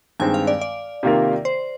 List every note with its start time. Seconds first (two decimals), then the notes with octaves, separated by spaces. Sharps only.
0.20 G2 D#3 G#3 C4 G#5
0.34 F5
0.47 D5
0.61 D5
1.03 C3 D#3 A#3 F4 A#4
1.45 C5